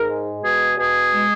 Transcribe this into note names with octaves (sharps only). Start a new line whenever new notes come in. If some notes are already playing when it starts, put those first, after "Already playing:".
Already playing: G#2 A#4
G#3
B2 G#4
B2 G#4
G#3